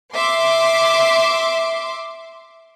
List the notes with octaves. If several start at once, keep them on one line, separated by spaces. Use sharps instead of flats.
E5 C6 D6